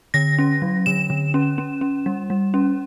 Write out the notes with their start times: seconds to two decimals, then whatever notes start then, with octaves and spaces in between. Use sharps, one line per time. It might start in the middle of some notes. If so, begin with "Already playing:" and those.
0.14 D3 A#6
0.39 C#4
0.62 F#3
0.86 D3 E7
1.10 D3
1.34 C#4
1.58 C#4
1.81 C#4
2.06 G3
2.30 G3
2.54 C#4